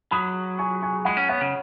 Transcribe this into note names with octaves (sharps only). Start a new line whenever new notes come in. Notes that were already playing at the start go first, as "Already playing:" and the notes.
F#3 B5 D#6
G#5 C#6
G#5 C#6
G#3 F#5 B5
C#4
B3 C#5 F#5
C#3